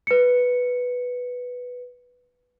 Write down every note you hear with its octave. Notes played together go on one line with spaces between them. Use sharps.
B4 C#7